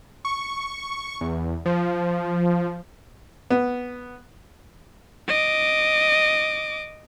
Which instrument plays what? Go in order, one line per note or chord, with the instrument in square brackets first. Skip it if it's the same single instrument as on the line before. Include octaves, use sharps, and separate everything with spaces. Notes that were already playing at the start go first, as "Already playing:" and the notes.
[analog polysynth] C#6
E2
F3
[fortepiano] B3
[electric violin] D#5 D6